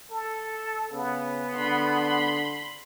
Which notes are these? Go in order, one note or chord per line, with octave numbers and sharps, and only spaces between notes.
A4
C#3 B3
D3 B5 C6